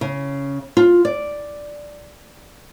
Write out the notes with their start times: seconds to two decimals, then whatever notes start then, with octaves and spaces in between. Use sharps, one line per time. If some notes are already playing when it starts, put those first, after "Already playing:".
0.01 C#3
0.77 F4
1.05 D5